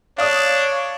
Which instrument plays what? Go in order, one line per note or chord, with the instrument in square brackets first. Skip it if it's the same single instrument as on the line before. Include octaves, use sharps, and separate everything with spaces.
[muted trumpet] D4 [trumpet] C#5 [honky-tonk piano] D5 D#6 [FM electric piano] F5